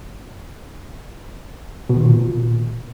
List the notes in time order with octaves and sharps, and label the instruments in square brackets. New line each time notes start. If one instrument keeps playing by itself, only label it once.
[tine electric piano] B2
D#3
A#2